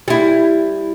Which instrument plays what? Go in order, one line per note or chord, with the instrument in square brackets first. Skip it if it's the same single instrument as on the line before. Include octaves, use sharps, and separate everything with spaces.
[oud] G3 E4